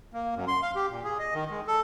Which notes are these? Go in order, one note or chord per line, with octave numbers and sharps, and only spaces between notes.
A#3
F#2
C6
F5
G4
A#2
G#4
D#5
D#3
G#3
A4